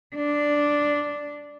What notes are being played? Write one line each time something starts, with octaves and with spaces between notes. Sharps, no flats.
D4